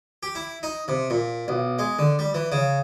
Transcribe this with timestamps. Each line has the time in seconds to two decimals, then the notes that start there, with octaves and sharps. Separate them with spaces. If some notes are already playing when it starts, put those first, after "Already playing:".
0.23 G4
0.35 E4
0.63 D#4
0.88 C3
1.10 A#2
1.48 B1
1.79 G#3
1.99 D3
2.19 G3
2.34 E3
2.52 C#3